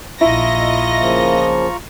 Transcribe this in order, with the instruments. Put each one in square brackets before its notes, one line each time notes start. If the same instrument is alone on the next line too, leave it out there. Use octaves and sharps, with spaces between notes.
[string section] A#1 D#5 A#6 [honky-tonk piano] E4 [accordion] F4 A#5 C#6
[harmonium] C#3 F3 A#3